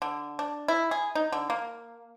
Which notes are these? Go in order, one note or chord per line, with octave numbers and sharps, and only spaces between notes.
D3
D4
E4
G#4
D#4
D3
A#3